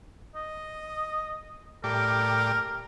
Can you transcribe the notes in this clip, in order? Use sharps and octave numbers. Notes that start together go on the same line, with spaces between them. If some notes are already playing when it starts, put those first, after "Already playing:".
D#5
A2 G4 A#4 D5